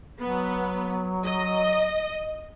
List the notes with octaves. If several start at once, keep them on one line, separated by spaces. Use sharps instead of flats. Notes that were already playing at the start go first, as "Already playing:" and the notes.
F#3 B3
D#5